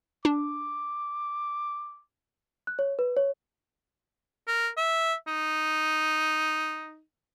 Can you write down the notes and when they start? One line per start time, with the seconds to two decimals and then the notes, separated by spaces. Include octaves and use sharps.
0.25 D4 D6
2.67 F#6
2.79 C#5
2.99 B4
3.17 C#5
4.47 A#4
4.77 E5
5.27 D#4